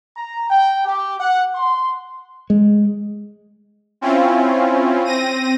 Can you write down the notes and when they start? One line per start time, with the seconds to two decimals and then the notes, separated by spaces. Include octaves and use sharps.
0.17 A#5
0.48 G5
0.85 G4
1.20 F#5
1.55 C6
2.50 G#3
4.01 C4 C#4 E4 F4
5.05 C4 A#6 D#7